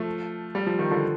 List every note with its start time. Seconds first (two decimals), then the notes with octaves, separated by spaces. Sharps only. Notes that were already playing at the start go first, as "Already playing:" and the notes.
Already playing: F3 A3
0.55 G3
0.67 F3
0.79 D#3
0.91 D3 F3